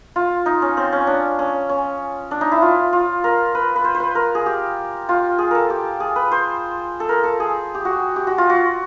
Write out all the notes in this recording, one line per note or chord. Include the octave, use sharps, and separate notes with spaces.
F4
D#4
C#4
C4
C#4
D4
C#4
C#4
D4
D#4
E4
F4
F4
A#4
B4
B4
C5
C5
B4
A#4
G#4
G4
F4
G#4
A4 A#4
G4
G#4
B4
C5
A4
A#4
A4
G#4
G4
F#4
G4
F#4
F4
F#4